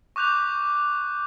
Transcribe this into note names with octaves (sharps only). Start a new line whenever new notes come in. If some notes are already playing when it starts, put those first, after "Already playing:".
C#6 D6 F#6 G6 F7